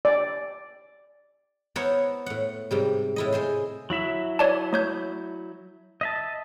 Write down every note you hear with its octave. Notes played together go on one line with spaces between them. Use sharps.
D5
B3 E4 A#4 C5 C#5 F#5
A2 F#5
G#2 C3 G3
A2 E4 D#5
G#3 C5 C6
F#3 E4 E5
C#5 D5 A5
A3 C#5 G6
D#5 E5 A5